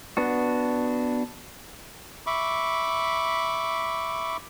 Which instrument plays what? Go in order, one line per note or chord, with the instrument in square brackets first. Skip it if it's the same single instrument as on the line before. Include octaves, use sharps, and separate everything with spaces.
[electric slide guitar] B3 D4 F#4
[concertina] E5 B5 C#6 D6